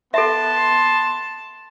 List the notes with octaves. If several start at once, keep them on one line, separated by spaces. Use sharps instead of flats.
B3 A4 E5 A5 C6